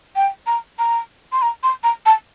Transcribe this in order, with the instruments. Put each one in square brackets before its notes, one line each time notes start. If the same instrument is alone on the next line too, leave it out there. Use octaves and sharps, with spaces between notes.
[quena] G5
A#5
A#5
C6
A#5
C6
A#5
A5